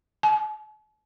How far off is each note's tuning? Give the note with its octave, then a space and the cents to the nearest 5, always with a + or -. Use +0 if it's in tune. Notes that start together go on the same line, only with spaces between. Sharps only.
A5 -45